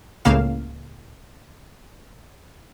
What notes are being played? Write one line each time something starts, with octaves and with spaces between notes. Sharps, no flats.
C#2 A2 C#3 A#3 F5 E7